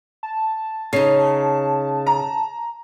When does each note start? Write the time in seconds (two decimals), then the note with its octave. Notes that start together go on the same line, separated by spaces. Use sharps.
0.23 A5
0.93 C#3 D#4 C7
2.07 A#5